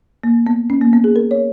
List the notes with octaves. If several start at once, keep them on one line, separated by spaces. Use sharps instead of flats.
A#3
B3
C#4
A#3
B3
G#4
A#4
C#5